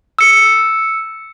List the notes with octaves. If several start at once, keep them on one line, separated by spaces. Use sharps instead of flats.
E6 C#7